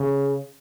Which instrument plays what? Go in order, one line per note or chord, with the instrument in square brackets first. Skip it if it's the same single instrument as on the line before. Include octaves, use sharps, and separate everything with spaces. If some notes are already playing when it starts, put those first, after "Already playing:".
Already playing: [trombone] C#3